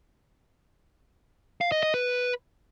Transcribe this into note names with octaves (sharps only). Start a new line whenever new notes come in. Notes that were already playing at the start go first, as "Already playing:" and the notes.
F5
D#5
D#5
B4